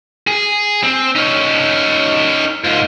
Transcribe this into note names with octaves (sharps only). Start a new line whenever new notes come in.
G#4
C4
C#4 D#4
G#2 F4